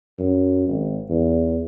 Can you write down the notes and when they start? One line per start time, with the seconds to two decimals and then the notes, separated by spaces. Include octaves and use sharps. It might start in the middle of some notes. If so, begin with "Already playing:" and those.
0.19 F#2
0.69 G#1
1.10 E2